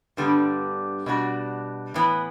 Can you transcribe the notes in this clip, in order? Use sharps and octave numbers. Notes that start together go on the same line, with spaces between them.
G2 D3 G3 B3 D4
B2 G3 D4 F#4
A2 E3 B3